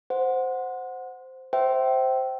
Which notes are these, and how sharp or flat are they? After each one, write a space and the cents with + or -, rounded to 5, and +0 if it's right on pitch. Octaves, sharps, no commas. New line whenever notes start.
C5 -5 F#5 -10
C5 +0 E5 +0 G5 -25